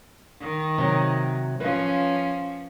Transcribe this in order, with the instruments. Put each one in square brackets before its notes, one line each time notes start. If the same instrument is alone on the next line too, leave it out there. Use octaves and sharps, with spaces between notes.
[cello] D#3
[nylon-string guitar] C3 F#3
[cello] F3 C#4 [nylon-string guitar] B4 F5